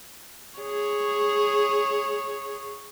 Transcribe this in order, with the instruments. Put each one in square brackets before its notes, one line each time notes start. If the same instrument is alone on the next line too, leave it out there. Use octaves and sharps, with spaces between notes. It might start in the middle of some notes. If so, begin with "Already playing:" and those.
[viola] G#4 C#5